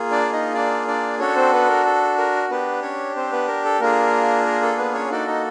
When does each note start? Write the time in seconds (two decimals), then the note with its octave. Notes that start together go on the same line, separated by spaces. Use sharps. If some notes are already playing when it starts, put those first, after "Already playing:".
Already playing: A#3 F4 G#4
0.11 D4 D5
0.33 D#4 D#5
0.54 D4 D5
0.88 D4 D5
1.19 C#4 D4 F#4 A4 C#5
1.36 C4 C5
1.53 B3 B4
1.68 A#4
1.85 A4
2.18 A#4
2.50 B3 D4 G4 B4
2.82 C#4 C#5
3.16 C4 C5
3.32 B3 B4
3.47 A#4
3.65 A4
3.80 A#3 D4 F4 G#4 A#4
4.46 A#4
4.62 A4
4.78 B3 B4
4.94 C#4 C#5
5.11 A#3 D4 D#4 F#4 A4 D5
5.27 D#4 D#5